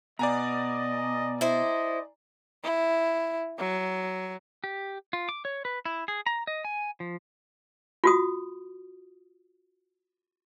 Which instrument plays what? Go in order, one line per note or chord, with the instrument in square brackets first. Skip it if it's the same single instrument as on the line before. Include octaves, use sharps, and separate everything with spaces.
[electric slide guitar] B2 [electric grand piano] D5 G#5 A#5 [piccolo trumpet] D#5
[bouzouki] E4 C5 [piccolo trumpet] D#5
[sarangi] E4
F#3
[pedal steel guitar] G4
F4
D6
C#5
B4
E4
G#4
A#5
D#5
G#5
F3
[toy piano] F4 F#4 D#6